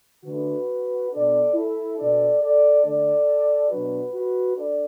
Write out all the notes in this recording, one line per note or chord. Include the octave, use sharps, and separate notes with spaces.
D3 A3 D4 F#4 B4
B2 B3 D4 A4 D5
E4 A4
B2 B3 D4 A4 D5
A4 D5
D3 A3 D4 A4 D5
B2 F#3 B3 D4 F#4 B4
F#4 B4
D4 A4 D5